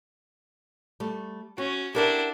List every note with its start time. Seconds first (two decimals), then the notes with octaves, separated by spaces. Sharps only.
1.00 G3 A3
1.58 C#4 F#4
1.95 D4 E4 G4 A#4 F#5